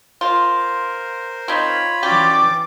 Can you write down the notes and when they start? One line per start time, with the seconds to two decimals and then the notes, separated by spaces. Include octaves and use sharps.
0.21 F4 A#4 C5
1.48 C4 D#4 F4 C#5 B5
2.03 E3 C#4 F#4 G4 D5 D6 A6